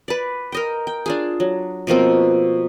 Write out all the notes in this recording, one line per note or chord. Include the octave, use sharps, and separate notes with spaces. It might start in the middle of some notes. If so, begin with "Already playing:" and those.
B4 D5
A#4 D#5 G5
G5
D4 F4 G#4
F#3
B2 F3 A#3 C4